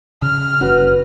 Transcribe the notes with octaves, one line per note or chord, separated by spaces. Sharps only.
C#3 F6
F#1 C#4 F#4 B4